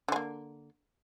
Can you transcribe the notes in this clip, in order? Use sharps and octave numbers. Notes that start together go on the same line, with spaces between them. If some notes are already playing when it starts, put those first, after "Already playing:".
D3 G#3 A#3